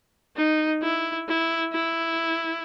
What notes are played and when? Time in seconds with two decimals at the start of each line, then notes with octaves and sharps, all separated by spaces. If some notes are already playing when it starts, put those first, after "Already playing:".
0.36 D#4
0.82 E4
1.28 E4
1.72 E4